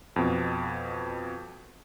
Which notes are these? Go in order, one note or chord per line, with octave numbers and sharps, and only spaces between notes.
F2 B2